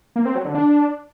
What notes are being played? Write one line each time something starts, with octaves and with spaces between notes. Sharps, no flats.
A#3
C4
F#3
D3
D4